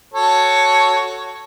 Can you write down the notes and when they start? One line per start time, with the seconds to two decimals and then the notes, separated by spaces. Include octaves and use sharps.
0.14 F#4 A4 C#5